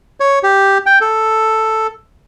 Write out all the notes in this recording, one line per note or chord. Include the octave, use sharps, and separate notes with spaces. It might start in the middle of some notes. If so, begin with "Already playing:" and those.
C#5
G4
G5
A4